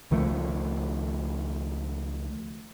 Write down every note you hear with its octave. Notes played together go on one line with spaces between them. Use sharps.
C#2 D#3 F3 A3